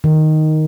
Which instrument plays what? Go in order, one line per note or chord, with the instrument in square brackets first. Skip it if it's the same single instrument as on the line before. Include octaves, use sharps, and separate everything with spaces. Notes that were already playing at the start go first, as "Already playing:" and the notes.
[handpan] D#3